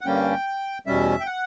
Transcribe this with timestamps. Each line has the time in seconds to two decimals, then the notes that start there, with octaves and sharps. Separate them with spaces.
0.01 F#5
0.06 G2 D3 G3 A#3 C#4 G5
0.87 E2 B2 G3 C#4 E5
1.20 G5
1.27 F#5